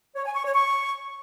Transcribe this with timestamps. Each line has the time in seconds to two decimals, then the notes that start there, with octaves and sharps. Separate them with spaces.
0.15 C#5
0.25 G#5
0.35 C#6
0.45 C#5
0.54 C#6